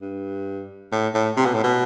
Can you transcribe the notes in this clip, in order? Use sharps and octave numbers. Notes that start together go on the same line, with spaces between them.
G2
A2
A2
C3
B2
A2
B2